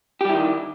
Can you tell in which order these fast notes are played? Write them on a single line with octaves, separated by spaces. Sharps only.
G4 G3 E4 D#3